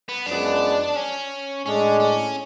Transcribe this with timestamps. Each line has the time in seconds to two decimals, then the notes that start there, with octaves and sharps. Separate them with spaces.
0.09 B3
0.26 F#2 F3 G#3 B3 D4
0.96 C#4
1.65 A2 G#3 C#4 D4
2.00 C#4